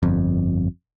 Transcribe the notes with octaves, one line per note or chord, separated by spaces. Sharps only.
G1 F2